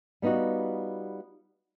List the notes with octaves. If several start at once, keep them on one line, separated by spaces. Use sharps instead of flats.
G3 B3 D#4 F4 F#4